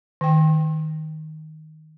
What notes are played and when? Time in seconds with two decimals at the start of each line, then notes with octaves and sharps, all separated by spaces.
0.21 D#3 G5